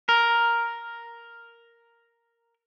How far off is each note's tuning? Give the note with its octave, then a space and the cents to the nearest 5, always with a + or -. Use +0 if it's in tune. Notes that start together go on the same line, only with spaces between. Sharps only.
A#4 +0